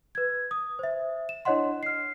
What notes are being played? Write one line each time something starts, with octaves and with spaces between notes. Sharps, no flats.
B4 G#6
D#6
C5 E5
E7
D4 E4 C#5 D#5 F#5 C6
F6 C7